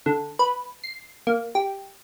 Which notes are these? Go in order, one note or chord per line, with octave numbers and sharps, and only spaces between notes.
D3
B4
C7
A#3
G4